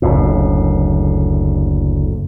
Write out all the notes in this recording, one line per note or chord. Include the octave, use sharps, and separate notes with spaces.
F#1 D2 A2